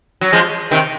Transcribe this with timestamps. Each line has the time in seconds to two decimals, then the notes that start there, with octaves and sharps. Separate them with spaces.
0.21 F#3
0.33 F3 G#3
0.71 C3 D#3